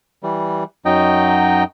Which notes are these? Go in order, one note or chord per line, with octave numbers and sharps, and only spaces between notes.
E3 G3
F#2 F#3 D#4 D#5 G5